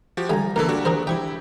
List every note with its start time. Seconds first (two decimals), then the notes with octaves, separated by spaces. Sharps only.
0.17 F3 F#4 G4
0.30 D3 G3 G#5 A#5
0.56 D3 E3 A#3 A4 A#4
0.68 D4 F#4 G4
0.85 G#4 A#4 C5
1.07 E4 G4 G5 C#6